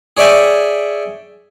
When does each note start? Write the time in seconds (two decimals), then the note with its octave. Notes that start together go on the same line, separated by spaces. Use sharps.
0.17 G#4 C#5 D5 E5 G5 G#5